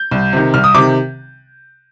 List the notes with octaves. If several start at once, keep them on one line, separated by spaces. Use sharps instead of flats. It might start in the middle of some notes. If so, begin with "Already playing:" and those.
Already playing: G6
C2
C3 D#3
C2 F6
D#6
C3 D#3 D6